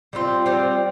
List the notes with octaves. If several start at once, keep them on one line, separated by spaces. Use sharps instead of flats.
G3 C4 F4
G3 C4 F4